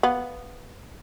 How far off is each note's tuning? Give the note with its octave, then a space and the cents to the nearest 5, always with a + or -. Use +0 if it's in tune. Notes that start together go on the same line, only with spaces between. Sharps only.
B3 +0 F5 +0